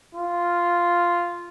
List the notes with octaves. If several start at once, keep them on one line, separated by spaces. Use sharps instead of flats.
F4